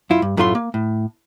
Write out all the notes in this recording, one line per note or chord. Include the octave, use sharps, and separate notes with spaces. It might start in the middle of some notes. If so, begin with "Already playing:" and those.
F#2 E4 F4
G2
F#2 A2 A3 F4 B5 C6
A#3
A2